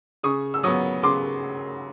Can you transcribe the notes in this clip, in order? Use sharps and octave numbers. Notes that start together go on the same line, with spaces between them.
C#3 C#6 D#6
E6
F#3 B3 C#6 D#6
C#3 C6 D6